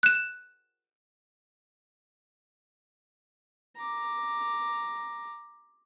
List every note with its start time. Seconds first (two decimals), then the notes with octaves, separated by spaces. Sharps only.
0.03 F#6 E7
3.76 A#5 D6